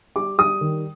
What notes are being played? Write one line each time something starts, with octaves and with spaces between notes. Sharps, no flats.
G3 D6
G3 D#6
D#3